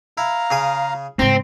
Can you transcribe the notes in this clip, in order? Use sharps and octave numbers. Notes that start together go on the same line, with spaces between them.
E4 F5 A#5
C#3 G#4 D#6
G#2 C#3 C4 A#5